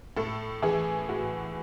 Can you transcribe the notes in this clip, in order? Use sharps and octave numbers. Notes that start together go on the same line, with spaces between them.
A2 A4
E3 G#4
A2 F#4